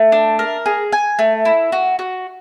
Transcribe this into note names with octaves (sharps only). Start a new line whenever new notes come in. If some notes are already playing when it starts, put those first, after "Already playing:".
Already playing: A3
D4
A#4
G#4
G#5
A3
E4
F#4
F#4